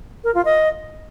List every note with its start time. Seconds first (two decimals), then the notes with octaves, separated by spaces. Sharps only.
0.24 A#4
0.34 F4
0.45 D#5